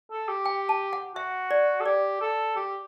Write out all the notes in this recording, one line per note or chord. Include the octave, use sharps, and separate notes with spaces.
A4
G4
G5
A5
F#5
F#4 E5
D5
A4
G4 D5
A4
G4